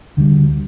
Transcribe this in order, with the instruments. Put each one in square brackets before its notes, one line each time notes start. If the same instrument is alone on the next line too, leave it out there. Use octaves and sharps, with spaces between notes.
[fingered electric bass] D2 D3 G3